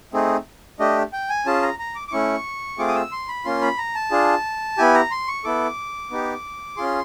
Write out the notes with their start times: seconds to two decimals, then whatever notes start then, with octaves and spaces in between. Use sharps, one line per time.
0.13 A3 C4 D#4 G#4
0.79 A3 D4 G4 D#5
1.13 G5
1.29 G#5
1.46 C#4 F4 G#4 A5
1.63 A#5
1.79 A#5
1.95 D6
2.08 D6
2.12 A3 C#4 E4 C#6
2.79 A3 C4 F4 G#4 D6
2.88 D#6
2.95 E6
3.12 C6
3.28 B5
3.45 A#3 C#4 F4 C6
3.61 B5
3.78 A#5
3.95 A5
4.11 D4 F4 G#4
4.78 B3 E4 G4 G#5
4.94 A#5
5.11 C6
5.28 C#6
5.44 B3 E4 A4 D6
6.11 B3 D#4 G4
6.77 C#4 F4 G#4 C6